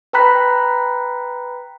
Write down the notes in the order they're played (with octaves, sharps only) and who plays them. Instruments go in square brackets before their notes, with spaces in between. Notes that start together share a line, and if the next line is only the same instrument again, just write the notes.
[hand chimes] B4 G5 A#5 B5 F#6 B6